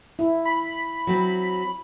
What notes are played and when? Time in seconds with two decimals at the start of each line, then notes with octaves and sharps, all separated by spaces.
0.19 E4
0.45 B5
1.07 F#3 C4